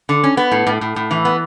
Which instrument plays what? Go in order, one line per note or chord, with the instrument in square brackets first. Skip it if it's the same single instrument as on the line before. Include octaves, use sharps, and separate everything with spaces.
[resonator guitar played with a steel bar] D3
C#4
B3
A2
A2
A2
A2
E3
B3